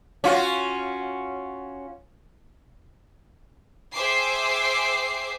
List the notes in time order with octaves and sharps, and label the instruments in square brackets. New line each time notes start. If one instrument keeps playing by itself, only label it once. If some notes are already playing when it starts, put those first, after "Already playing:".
[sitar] C#4 F4 F#4
[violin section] G#4 C5 E5 G5 D6 C7